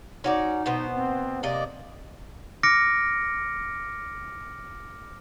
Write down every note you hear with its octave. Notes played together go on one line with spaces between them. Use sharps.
C#4 D#4 F#4 D5
B2 B3 C5
C4
C3 A#3 D5 D#5
D6 F6 A#6 C#7 D7